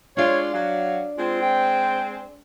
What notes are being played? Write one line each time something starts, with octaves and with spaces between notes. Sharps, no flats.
G#3 D4 F4 C#5 D5
F#3 F5
G#3 C4 F4
G5